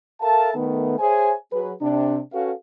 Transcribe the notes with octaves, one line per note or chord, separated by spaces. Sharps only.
A4 A#4 E5 F5 A5
D#3 A3 B3
G#4 C5 C#5 E5 G#5
F#3 G#4 B4
C3 D4
C#4 F#4 A4 B4 F5